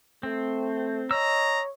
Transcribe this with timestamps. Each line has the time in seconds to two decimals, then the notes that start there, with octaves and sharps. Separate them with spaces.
0.23 A3 C4
1.11 C#5 D#5 A#5 E6